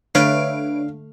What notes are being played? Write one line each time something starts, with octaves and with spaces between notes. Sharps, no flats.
D3 A3 B4 C#5 F5 D7